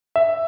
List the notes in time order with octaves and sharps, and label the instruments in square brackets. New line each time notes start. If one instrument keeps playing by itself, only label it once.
[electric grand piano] E5